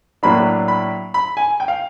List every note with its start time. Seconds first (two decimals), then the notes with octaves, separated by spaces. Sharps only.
0.23 A2 F#3 A#3 D4 B5
0.68 B5
1.14 B5
1.37 G#5
1.60 G5
1.68 F5